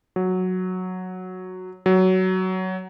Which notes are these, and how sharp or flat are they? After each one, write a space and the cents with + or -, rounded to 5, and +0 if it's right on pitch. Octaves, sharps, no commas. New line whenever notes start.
F#3 -5
F#3 +15